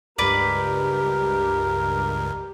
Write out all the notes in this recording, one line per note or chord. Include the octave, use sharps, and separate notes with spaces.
C#2 G2 G4 A#4 B4 D5